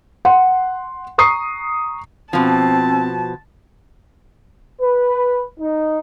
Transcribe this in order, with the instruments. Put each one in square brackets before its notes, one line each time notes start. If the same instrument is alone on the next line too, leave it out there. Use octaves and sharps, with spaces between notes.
[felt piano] F#5 C6
A#5 C#6 D#6 C7
[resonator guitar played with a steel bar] B2 F3 [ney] C4 [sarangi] A5
[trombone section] B4
D#4